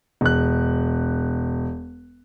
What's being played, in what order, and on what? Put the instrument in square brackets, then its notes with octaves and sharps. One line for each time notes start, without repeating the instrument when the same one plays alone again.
[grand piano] E1 F#6